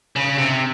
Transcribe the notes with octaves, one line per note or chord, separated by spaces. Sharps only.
C#3
C3